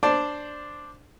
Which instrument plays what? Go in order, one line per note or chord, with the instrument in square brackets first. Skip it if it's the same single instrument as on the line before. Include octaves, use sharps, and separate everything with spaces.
[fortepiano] D4 C5 D5 A5